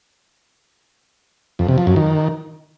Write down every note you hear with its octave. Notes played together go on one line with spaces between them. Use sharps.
F2
C3
F3
F#2
D#3